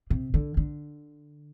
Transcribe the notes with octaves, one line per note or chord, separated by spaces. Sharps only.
C3
D3
D3